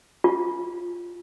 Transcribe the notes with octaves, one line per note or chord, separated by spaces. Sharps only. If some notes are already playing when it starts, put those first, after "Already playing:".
F4